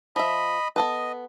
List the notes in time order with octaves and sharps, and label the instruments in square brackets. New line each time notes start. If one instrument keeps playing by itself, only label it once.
[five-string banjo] F3 E5 [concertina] D#5 B5
[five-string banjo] B3 A4 B4 [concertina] D#5